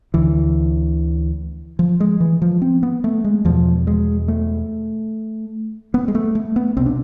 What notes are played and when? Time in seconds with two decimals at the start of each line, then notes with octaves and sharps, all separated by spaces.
0.14 D2 D3 E3
1.79 F3
2.00 G#3
2.20 E3
2.42 F3
2.62 C4
2.83 B3
3.04 A3
3.24 G#3
3.45 E2 B2 F3
3.87 G#3
4.28 A3
5.94 B3
6.08 G#3
6.15 A3
6.35 A3
6.56 B3
6.77 C2 B2 C4
6.86 D4